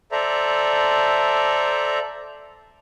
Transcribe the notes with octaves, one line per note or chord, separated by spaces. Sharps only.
A4 C5 D5 E5 A#5